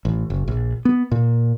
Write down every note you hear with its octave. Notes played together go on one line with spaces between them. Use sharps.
A1
F#1
A#1
B3
A#2